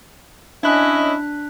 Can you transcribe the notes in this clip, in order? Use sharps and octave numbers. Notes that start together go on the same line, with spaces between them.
C#4 D4 E4 D#5 F#6 B6